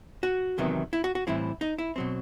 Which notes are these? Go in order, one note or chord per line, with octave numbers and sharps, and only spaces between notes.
F#4
E2 C3 D#3 F#3 B3
E4
F#4
F#4
A2 E3 G3 C4 E4
D#4
E4
B2 F#3 C4